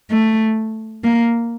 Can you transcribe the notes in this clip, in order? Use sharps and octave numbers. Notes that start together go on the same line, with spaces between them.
A3
A#3